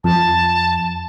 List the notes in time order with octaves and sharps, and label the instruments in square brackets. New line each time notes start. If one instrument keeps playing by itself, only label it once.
[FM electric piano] F2 [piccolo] A5